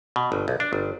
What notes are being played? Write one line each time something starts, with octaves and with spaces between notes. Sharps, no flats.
B2
G1
B1
D4
G1